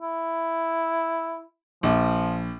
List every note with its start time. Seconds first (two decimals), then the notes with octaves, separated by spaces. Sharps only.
0.02 E4
1.83 A#1 F3